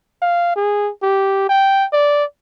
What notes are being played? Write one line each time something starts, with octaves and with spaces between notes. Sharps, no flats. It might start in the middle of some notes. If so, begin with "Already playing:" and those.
F5
G#4
G4
G5
D5